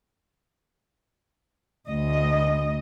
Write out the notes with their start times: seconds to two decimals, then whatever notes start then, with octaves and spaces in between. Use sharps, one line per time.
1.87 D2 D#5